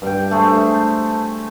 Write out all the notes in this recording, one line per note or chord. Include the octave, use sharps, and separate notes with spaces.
G2 G5
A3 G#4 C5